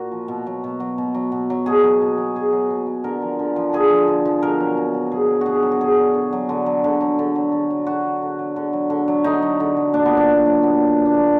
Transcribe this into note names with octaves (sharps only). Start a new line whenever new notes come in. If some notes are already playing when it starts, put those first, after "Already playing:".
Already playing: A#2 F#4 A#4
F3
B2
F#3
B2
F#3
B2
F#3
B2
F#3
B2 G#4
F#3
B2
F#3
B2 G#4
F#3
B2
F#3
D3 A#4
F3
D3
F3
D3 G#4
F3
D3
F3
B2 A#4
F#3
B2
F#3
B2 G#4
F#3
B2 F#4 G#4
F#3
F#4
D3 G#4
F#3
D3
F#3
D3
F#3
D3
F#3
D3
F#3
D3
F#3
D3 F#4
F#3
D3
F#3
D3
F#3
D3
F#3
D3 D#4
F#3
D3
F#3
A#2 D4
B3
F#3
D4
A#2
F#3
A#2 B3
F#3
A#2
D4
F#3 B3